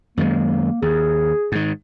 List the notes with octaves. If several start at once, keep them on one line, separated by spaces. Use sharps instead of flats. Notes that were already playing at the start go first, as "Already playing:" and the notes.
F#2 D#3 G#3 A#3
D#2 G#4
G#2 D#3